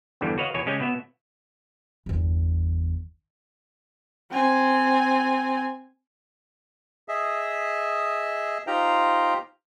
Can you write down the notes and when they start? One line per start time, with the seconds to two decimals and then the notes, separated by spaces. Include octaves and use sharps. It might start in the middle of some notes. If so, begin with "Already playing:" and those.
0.21 E2 G2 D3 E3 G3
0.38 F#4 B4 C#5 D#5 F5
0.54 E2 B2 C#5 G#5
0.66 C#3 G#3 C#4 G4 G5 G#5
0.80 B2 B3 E5
2.06 G1 E2
4.32 C4 G#5
7.08 G#4 D#5 E5
8.67 D#4 F4 G4 C5 G5 A#5